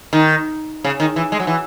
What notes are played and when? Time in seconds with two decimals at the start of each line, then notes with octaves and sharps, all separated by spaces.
0.13 D#3
0.84 C#3
1.00 D#3
1.16 E3
1.32 G#3
1.40 F#3
1.47 E3